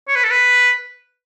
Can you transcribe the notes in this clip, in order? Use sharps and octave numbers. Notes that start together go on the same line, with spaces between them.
C#5
B4
A4
B4